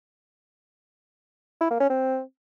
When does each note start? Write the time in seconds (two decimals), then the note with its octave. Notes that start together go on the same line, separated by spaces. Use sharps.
1.61 E4
1.71 A#3
1.80 C#4
1.90 C4